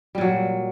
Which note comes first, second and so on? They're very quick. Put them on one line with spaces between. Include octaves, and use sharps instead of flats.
G3 A#2 F#3